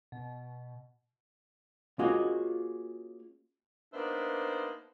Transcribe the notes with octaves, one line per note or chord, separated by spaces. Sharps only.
B2
A#3 C#4 F4 F#4 G#4 D#5
A#3 B3 D4 D#4 C5 E5